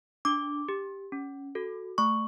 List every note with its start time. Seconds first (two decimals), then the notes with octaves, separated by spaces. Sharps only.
0.25 D4 D6
0.69 G4
1.12 C#4
1.55 F#4 A4
1.98 A3 C#6